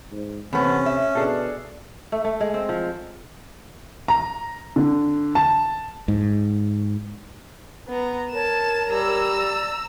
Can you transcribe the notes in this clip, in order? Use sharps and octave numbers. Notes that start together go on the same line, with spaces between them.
G#2
E2 C3 A3 B3 C#4
E5
B2 D4 G#4 A4
A3
A3
G#3
C4
F3
A#5
D3
A5
G#2
B3 A#5
A#4 C#5 A5 E7
G3 A#5 E6
D5